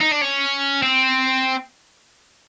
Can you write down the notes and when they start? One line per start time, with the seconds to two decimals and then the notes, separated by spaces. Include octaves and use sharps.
0.01 D#4
0.12 D4
0.22 C#4
0.83 C4